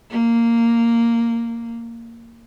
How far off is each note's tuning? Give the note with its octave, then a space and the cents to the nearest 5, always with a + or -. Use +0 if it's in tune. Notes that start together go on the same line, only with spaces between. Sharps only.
A#3 -10